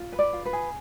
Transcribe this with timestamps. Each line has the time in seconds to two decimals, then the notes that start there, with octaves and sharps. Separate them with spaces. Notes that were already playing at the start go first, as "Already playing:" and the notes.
Already playing: F4
0.12 B4
0.19 D5
0.33 F4
0.46 B4
0.53 G#4